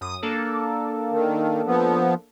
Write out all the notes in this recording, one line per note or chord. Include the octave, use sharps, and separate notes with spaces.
F#2 D#6
A#3 D4 A4
D#3
F3 B3